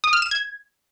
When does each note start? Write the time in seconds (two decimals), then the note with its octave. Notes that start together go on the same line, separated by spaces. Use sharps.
0.04 D#6
0.13 F6
0.22 E7
0.31 G#6